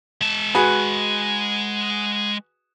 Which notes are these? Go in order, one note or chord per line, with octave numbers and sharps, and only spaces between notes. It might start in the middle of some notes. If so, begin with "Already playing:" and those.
G#3 A5
F#4 G#4 B4